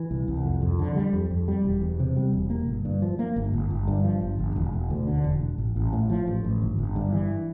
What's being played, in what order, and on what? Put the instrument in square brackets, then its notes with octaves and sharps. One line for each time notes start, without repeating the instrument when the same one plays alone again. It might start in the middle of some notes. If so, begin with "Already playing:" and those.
Already playing: [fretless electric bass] E3
C2
C2
F2
F2
D3
G3
F2
F2
G3
E1
E2
C3
G3
E1
A#3
G1
G2
F3
A#3
G1
G1
G1
G2
F3
G1
G1
E1
E1
D2
D3
E1
E1
A1
A1
A2
F3
A1
A1
G1
G1
G2
E3